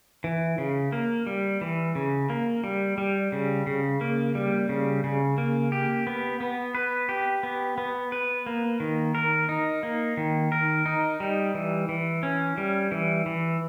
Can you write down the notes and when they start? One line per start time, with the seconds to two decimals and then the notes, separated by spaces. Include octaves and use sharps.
0.24 E3
0.58 C#3
0.92 A#3
1.27 G3
1.61 E3
1.95 C#3
2.30 A#3
2.64 G3
2.98 G3
3.32 C#3
3.67 C#3
4.01 A#3
4.35 G3
4.69 C#3
5.04 C#3
5.38 A#3
5.72 G4
6.07 B3
6.40 B3
6.75 B4
7.09 G4
7.43 B3
7.78 B3
8.12 B4
8.46 A#3
8.80 D#3
9.15 A#4
9.49 D#4
9.83 A#3
10.17 D#3
10.52 A#4
10.86 D#4
11.20 G3
11.55 E3
11.89 E3
12.23 C#4
12.58 G3
12.92 E3
13.26 E3